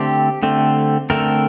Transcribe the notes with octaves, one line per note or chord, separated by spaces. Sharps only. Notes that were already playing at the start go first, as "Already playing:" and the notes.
Already playing: D3 A3 C4 G4
D3 A3 C4
D3 A3 C4 A#4